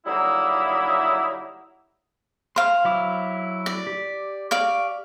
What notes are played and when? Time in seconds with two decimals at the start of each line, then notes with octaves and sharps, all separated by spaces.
0.06 D3 F#3 G3 A#3 D#4 E4
2.56 C5 F5 C6 F6
2.85 F#3 E4 D6
3.66 D5
3.87 G4
4.51 D5 F5 C#6